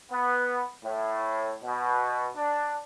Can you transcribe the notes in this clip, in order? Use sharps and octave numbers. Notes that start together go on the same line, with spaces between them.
B3
A2
B2
D4